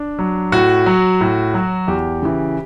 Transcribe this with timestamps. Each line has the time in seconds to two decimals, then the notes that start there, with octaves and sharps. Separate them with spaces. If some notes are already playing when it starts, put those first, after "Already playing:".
Already playing: D4
0.19 F#3
0.52 A2 F#4
0.86 F#3
1.21 A2
1.54 F#3
1.88 E2 G4
2.22 C#3 E3